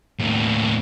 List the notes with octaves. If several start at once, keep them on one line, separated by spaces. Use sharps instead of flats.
D#2 A2